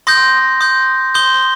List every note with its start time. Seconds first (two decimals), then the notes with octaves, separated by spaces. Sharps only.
0.07 C6 D#6 G6 A#6
0.61 C6 D#6 G6
1.14 C6 D#6 G6 G7